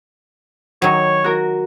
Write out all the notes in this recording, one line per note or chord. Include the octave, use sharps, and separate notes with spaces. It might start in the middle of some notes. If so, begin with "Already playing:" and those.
D#3 F#3 C#5
F#4 A#4